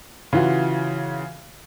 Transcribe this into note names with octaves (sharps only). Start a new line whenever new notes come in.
C#3 E3 F4 F#4